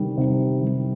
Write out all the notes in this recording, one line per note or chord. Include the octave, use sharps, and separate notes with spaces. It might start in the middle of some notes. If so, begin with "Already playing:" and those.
Already playing: C3 D#3 G3
C3
D#3 G3